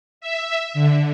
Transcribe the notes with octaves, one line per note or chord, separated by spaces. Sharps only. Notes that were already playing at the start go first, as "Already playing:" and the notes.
E5
D3